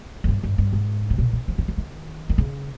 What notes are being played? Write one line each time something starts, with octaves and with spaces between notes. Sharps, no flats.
F2
G2
G2
G2
G#2
C3
A#2
C#3
F3
D#3
F3
D#3
D#3
C#3